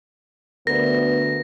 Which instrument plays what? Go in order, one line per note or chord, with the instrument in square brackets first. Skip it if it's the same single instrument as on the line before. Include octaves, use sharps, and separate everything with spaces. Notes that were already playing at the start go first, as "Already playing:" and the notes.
[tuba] D2 [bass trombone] B3 [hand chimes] A#4 D5 [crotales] A#6